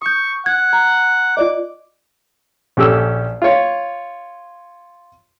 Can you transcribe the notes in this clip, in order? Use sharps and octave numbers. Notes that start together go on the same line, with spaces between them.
C#6 D#6 G6
F#5 G#6
A#5
F4 D5 D#5 D6
A#1 C#4 G4 A4 E6
F4 C#5